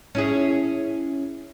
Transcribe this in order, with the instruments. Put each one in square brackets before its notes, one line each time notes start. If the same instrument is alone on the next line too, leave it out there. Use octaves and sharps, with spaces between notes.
[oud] C#4 E4 G#4